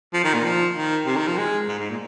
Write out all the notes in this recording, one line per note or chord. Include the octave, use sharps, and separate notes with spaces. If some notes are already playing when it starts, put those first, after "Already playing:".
F3
D#3
A#2
F3
D#3
C3
D#3
F3
G#3
G#2
G#2
A#2